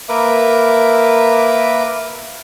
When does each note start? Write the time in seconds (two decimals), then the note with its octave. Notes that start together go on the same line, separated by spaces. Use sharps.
0.09 A#3 A#4 B4 E5 D6